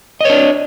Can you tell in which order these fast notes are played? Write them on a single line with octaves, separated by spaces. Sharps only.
D#5 C#5 D4